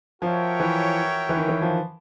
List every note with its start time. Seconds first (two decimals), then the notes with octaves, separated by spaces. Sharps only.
0.22 F3 F#4 A#4 C#5 E5 G5
0.60 E3
1.29 E3
1.37 D#3
1.49 E3
1.62 F3